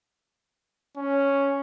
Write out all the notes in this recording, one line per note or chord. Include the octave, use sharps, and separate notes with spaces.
C#4